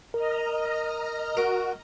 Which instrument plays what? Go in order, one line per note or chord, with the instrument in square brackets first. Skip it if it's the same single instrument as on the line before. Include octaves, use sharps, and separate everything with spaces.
[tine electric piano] A#4 [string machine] D#5 A#5 F6
[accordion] F#4 [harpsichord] A#4